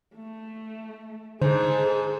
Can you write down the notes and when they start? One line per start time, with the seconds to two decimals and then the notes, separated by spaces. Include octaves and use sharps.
0.16 A3
1.42 G#2 D3 G#4 A4 C5